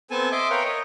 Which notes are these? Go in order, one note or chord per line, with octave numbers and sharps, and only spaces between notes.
B3 C4 A4 G#5 A5
D#5 E5 C6 D6
A#4 B4 C#5 F5 G5
C#5 D#5